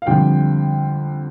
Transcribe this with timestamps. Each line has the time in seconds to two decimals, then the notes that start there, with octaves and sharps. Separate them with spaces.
0.02 F5
0.07 F2 D3 G3 G5